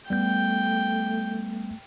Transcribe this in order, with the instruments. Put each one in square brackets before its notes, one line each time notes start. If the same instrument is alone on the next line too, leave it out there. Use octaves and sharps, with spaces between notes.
[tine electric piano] G3 B3 G6 [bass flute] A3 [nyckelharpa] G5